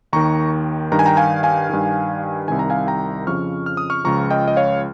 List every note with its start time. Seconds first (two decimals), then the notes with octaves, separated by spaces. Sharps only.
0.13 D#2 D#3 A#5 C#6
0.92 G2 D#3 A#5
0.99 G#5
1.06 G5 A#5
1.17 F5 G#5
1.43 F5 G#5
1.70 G2 D#3
2.48 C2 C3 D#3 G#5
2.59 A#5
2.70 F5 G#5
2.87 G5 A#5
3.27 F2 C#3 F3 C#6 F6
3.66 F6
3.77 D#6
3.90 C#6 F6
4.04 C#2 C#3 F3 A#5 C#6
4.31 D#5 G5
4.48 D#5
4.57 C#5 F5